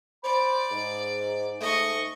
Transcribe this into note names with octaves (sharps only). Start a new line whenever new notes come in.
C5 D5 B5
G#2
G#2 A3 D#5 C#6